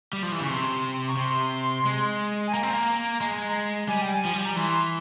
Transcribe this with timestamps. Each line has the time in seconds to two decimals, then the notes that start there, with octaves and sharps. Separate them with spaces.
0.13 G3
0.23 F3
0.32 E3
0.41 C#3 C#6
0.50 C3 C6
1.08 C#6
1.17 C3 C6
1.85 G#3
2.47 G#5
2.53 A#3 A#5
2.63 C4
2.73 A#3
3.21 G#3
3.88 G3 G#5
4.01 G5
4.14 G#5
4.25 F3
4.33 G3
4.45 A#5
4.56 E3 C6